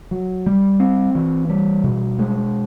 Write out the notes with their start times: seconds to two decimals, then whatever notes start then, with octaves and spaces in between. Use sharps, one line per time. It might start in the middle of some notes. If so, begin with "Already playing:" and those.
0.11 F#3
0.46 G3
0.80 C4
1.15 E3
1.49 G3
1.84 B2
2.19 G#3